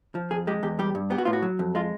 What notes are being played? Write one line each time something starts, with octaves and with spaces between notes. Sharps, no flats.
F3
F2 G#4
G#3 G4
E2 G4
G3 G4
G2
B3 G4
F#4
A2 F4
F#4
F#3
F2
G#3 F4